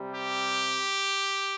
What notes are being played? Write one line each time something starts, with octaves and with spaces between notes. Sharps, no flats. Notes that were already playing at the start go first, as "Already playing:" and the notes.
Already playing: C3 G3
G4